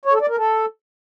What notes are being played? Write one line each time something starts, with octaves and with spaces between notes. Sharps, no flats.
C#5
A4
D5
A#4
A4